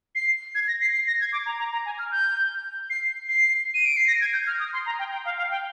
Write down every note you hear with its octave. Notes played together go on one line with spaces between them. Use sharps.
C7
G#6
A#6
C7
C7
A#6
G#6
D6
A#5
A#5
A#5
G#5
F6
G6
C7
C7
D#7
D7
C7
A#6
G#6
G6
F6
D#6
C6
A#5
G5
G5
F5
F5
G5